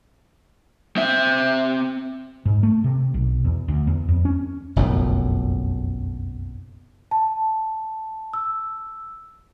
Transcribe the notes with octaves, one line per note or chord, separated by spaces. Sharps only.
C4 E5
G#2
A3
C3
B1
E2
D2
E2
F2
C#4
F#1 B1 F2 A2
A5
E6